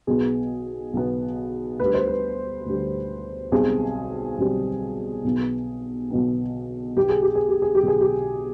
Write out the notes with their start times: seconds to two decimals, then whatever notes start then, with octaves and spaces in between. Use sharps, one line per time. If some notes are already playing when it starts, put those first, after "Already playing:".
0.07 B1 B2 B3 G#4
0.93 B1 B2 B3
1.80 D2 D3 G3 B4
1.94 C5
2.08 B4
2.66 D2 D3 G3
3.52 B1 B2 G3 C4 G#4
4.38 B1 B2 G3 C4
5.24 B1 B2 B3
6.10 B1 B2 B3
6.96 B1 B2 B3 G4
7.09 G#4
7.23 G4
7.35 G#4
7.49 G4
7.62 G#4
7.75 G4
7.82 B1 B2 B3
7.88 G#4
8.01 G4